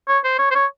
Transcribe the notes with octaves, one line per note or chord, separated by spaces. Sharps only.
C#5
C5
C#5
C5
C#5